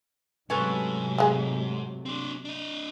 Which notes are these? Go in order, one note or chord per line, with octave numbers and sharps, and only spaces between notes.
G#2 C3 F#3 A3 C#4 A4 B4
G#3 G#4
C4 D4
D4 D#5